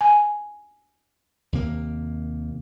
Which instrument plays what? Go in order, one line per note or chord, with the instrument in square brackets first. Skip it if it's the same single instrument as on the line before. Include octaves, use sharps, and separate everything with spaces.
[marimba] G#5
[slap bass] D#2 C3 A#3